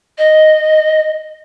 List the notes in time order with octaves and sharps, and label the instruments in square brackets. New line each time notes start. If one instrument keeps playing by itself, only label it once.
[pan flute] D#5